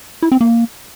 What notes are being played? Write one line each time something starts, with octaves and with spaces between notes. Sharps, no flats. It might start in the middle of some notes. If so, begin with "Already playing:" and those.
E4
C4
A#3